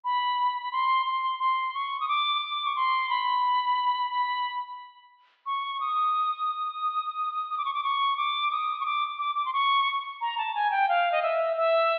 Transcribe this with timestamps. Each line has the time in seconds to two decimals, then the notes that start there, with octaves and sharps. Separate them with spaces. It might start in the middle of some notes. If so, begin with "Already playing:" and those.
0.05 B5
0.62 B5
0.72 C6
1.06 C6
1.39 C6
1.74 C#6
2.00 D#6
2.08 D6
2.42 D6
2.65 C#6
2.76 C6
3.10 B5
4.11 B5
5.46 C#6
5.80 D#6
7.50 D#6
7.58 D6
7.65 C#6
7.74 D6
7.84 C#6
8.17 D6
8.51 D#6
8.80 C#6
8.86 D6
9.19 D6
9.35 D6
9.46 C6
9.53 C#6
10.21 A#5
10.38 A5
10.55 G#5
10.71 G5
10.89 F5
11.12 D#5
11.22 E5
11.57 E5